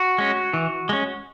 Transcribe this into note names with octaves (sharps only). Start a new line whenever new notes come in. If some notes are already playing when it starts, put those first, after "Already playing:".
Already playing: F#4
G#3 C#4
E3
G#3 C#4